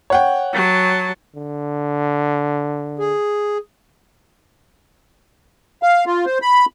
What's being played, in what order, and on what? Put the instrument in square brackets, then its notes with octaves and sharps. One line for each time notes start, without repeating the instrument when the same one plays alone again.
[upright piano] C#5 F#5 G5
[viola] F#3 A5
[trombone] D3
[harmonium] G#4
[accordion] F5
F4
C5
B5